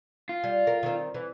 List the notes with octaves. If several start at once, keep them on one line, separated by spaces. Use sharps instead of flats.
F4
G3
A#4
D#3 C4
E3